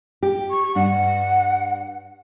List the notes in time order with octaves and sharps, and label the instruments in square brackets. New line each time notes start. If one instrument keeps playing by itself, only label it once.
[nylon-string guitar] G4
[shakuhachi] C#6
[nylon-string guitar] G2 D4 [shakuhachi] F#5